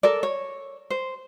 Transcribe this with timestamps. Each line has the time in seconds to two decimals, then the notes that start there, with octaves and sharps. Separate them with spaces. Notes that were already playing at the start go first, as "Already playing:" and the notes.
0.03 A4 A#4 D5
0.23 C#5
0.90 C5